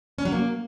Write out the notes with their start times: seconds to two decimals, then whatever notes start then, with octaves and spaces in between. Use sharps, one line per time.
0.18 C#4
0.25 F#3
0.32 A#3